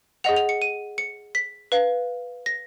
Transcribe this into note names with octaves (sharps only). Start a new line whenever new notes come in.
G#4 D#5 F#5 F7
F7
C#7
D#7
C#7
B6
B4 F5
A#6